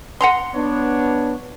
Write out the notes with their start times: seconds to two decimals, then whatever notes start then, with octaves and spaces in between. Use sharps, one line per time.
0.21 F#5 A#5 C6
0.54 B3 D4 C#5